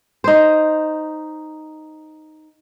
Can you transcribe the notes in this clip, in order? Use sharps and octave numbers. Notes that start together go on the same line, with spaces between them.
D#4 C5